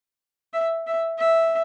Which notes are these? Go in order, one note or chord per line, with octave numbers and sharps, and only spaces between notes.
E5
E5
E5